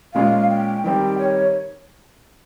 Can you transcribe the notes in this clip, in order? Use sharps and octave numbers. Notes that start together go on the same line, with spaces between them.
A#2 G#3 C#4 F4 F5
G5
D#3 G3 C4 D#4 G5
C#5